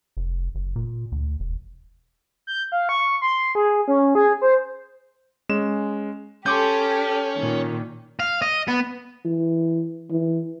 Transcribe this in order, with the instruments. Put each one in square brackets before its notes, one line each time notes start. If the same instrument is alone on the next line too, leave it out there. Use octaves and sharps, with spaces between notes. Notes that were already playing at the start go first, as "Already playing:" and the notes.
[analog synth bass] F1
F#1
A#2
D2
E1
[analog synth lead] G6
F5
C#6
C6
G#4
C#4
G#4
C5
[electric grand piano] G#3 C#4 E7
[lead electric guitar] C#4 [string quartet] G4 A4 [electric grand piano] C6 D6 G6
[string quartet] A#2 D#3
[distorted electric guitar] F5
D#5
B3
[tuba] E3
E3